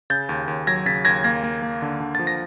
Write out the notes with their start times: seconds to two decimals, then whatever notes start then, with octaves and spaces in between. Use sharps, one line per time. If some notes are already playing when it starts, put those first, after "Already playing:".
0.10 C#3 G6 A6
0.29 D#2
0.48 D#2
0.67 F#3 G#6 A#6
0.86 C#3 A6 B6
1.05 D#2 G#6 A#6
1.24 A#3 G#6 A#6
1.43 A#3
1.62 A#3
1.82 D3
2.00 D3
2.15 F3 A6
2.27 A#6